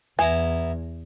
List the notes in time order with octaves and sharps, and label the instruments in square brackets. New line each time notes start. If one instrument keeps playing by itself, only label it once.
[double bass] E2 [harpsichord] B3 E4 A#5 [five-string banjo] G#5